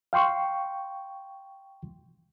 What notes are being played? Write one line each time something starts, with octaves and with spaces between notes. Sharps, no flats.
F5 G5 C6 C#6